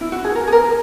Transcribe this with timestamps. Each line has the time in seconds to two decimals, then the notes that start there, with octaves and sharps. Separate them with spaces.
0.01 E4
0.12 F#4
0.24 G#4
0.35 A#4
0.47 G#4
0.52 A#4